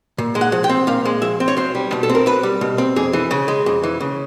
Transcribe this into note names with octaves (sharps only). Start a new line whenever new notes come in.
A#2
G#3
F#5
F3
G5
C4
A#2 F5
G#3
F3 E5
C4
C#5
B1 C5
G3
B2
A4
C4
A#4
B1 B4
G3
B2
C4
F2 G#4
E3
C#3
G#3
F2
E3
C#3